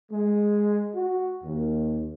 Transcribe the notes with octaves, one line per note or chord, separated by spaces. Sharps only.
G#3
F#4
D#2